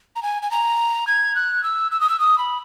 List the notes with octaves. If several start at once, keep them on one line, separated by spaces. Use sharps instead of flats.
A#5
G#5
G#5
A#5
G#6
F#6
E6
E6
D#6
E6
D#6
B5